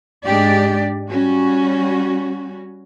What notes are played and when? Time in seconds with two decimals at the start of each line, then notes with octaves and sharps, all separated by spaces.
0.25 G#2 G#3 D4 G4 D5
1.09 G3 C#4 F#4